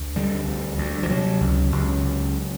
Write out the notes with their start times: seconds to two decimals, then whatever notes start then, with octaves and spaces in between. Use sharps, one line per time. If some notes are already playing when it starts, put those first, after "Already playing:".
Already playing: D2
0.16 D3 G3
0.48 D2
0.78 D2
1.03 F3
1.10 C3 F#3
1.41 C#2
1.72 C#2
2.04 C#3